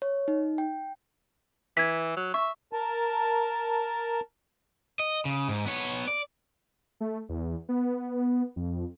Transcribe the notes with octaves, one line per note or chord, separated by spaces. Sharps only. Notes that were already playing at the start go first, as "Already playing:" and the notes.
C#5
D#4
G5
E3 G#6 B6
F#3
E5 C#6
A#4 A5
D#5
C#3
G#2
B3 C#5
D5
A3
E2
B3
F2